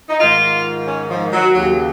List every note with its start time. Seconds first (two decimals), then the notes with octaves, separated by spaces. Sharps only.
0.09 D#4
0.20 G#2 D#3 F4
0.88 C#4
1.10 F3
1.32 F#3
1.54 D#2 C#3 F#3